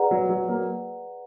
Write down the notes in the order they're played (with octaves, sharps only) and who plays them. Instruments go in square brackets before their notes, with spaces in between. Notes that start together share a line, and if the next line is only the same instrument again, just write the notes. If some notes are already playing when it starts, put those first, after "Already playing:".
Already playing: [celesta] G#4 B4 D5 F#5 A#5
[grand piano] F#3
F#3
F#3 A#3